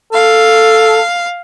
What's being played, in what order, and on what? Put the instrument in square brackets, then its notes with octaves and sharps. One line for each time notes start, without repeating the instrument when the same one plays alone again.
[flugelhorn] A4 [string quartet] F5